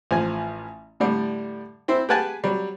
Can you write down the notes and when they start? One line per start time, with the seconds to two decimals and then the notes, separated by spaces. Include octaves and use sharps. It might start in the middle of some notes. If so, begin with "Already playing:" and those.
0.11 A1 F3 G#5
1.00 A2 D3 G3
1.88 C4 E4 C5
2.09 G4 G#4 B4 F#5 G#5 A5
2.44 F#3 G3